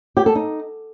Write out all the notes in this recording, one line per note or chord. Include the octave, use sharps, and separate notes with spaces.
G4
A4
D#4